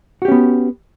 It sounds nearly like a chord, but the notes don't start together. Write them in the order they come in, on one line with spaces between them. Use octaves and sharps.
F#4 G4 C#4 B3